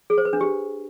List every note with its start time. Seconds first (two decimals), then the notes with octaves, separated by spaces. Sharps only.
0.10 G#4
0.18 C5
0.25 B4
0.33 D4
0.41 G4